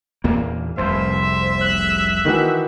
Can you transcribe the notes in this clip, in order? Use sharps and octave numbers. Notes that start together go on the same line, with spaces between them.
E2 A#2 A#3
F1 C2 F2 C5 E5
F#6
D#3 E3 F#4